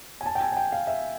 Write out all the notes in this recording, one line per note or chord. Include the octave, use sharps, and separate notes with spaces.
G#5
A5
G5
G#5
G#5
G5
F5
E5